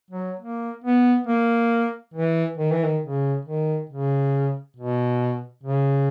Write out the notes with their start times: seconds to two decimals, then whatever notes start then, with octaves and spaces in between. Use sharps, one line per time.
0.11 F#3
0.40 A#3
0.84 B3
1.27 A#3
2.14 E3
2.58 D#3
2.72 E3
2.84 D#3
3.03 C#3
3.46 D#3
3.90 C#3
4.77 B2
5.64 C#3